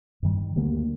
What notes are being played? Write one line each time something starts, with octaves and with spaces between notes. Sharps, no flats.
G2 D#3 G3
D2 D3 G3 A#3